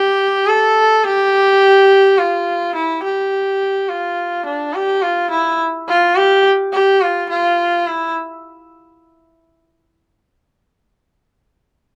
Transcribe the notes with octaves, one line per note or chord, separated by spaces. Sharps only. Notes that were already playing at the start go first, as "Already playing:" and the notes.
Already playing: G4
A4
G4
F4
E4
G4
F4
D4
G4
F4
E4
F4
G4
G4
F4
F4
E4